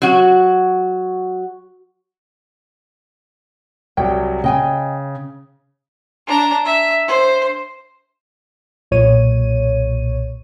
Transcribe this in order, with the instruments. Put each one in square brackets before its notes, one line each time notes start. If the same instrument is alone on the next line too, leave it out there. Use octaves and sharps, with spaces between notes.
[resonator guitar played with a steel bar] F#3 F#4
[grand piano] C2 F#3 [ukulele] G5
[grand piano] C#3 [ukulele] D#5 G5 G#5
[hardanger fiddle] D4 A#5
E5
C5
[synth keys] B1 A#2 C#5 D#7